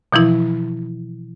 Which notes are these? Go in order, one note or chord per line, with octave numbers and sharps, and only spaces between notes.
B2 E3 F3 E4